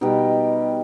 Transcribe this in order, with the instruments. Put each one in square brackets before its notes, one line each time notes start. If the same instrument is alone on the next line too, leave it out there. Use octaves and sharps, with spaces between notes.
[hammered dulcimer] B2 G3 D#4